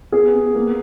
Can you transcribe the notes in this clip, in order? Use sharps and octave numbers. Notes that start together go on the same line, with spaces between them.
B3 G#4
B3
A#3